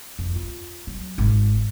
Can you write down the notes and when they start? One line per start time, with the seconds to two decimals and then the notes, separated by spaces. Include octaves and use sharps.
0.19 F2
0.35 F4
0.87 F#3
1.18 G#1